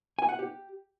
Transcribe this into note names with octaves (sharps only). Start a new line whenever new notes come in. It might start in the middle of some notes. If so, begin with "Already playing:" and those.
G#5
F#5
G4